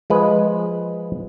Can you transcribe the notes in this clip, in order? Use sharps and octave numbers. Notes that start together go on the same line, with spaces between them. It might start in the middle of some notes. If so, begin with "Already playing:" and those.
F3 G#3 B4